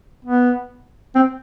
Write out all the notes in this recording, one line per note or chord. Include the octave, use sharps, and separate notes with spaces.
B3
C4